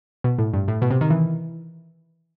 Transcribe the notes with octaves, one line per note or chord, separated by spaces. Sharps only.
B2
A2
G2
A2
B2
C3
D#3
E3